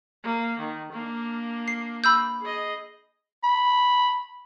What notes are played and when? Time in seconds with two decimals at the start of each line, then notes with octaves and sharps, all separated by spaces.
0.24 A#3
0.59 D#3
0.93 A#3 D4
1.68 C7
2.04 B5 E6 G6
2.41 G#4 D#5
3.43 B5